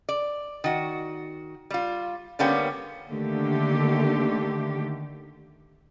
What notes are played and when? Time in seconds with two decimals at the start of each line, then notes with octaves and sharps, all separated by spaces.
0.09 D5
0.64 D#3 F#4
1.70 G3 F4
2.39 D3 G3 A#3 B3 C#4 G4
3.10 D3 D#3 A3 A#3 G4